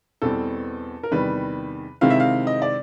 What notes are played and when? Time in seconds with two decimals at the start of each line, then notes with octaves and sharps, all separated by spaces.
0.22 E2 B2 G3 C4 A4
1.03 A#4
1.11 E2 C3 D#3 G3 B4
2.01 C3 D#3 G#3 C4 E4 F5
2.10 E5
2.20 F5
2.47 D#5
2.62 D5